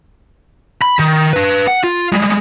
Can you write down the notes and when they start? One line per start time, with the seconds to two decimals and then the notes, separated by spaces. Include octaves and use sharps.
0.82 B5
0.99 D#3
1.33 D4 B4
1.67 F#5
1.84 F4
2.12 G3 G#3